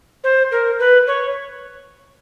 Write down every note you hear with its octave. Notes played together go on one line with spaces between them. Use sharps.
C5
A#4
B4
C#5